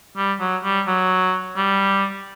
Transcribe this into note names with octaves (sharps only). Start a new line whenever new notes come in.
G3
F#3
G3
F#3
G3